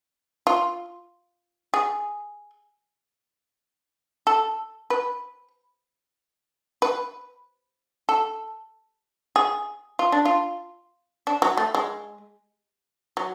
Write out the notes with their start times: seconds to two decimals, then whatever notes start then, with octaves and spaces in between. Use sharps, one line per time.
0.47 F4
1.74 G#4
4.27 A4
4.90 B4
6.82 B4
8.09 A4
9.36 G#4
9.99 F4
10.12 D4
10.25 F4
11.27 D4
11.42 F#3
11.57 A3
11.75 G#3
13.17 F#3